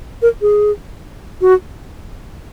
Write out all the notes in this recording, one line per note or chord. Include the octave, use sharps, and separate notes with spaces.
A#4
G#4
F#4